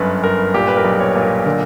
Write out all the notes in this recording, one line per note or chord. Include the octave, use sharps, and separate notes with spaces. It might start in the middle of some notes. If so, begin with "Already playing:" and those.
Already playing: G1 F#2 B4
G1 A#4
A#2 G4
B4
A#4
B1
C#5
A#2
A#4
D3 A#4